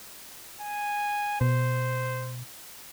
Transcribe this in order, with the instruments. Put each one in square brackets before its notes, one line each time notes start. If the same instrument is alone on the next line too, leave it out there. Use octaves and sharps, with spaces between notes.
[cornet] G#5
[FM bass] B2 [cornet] C5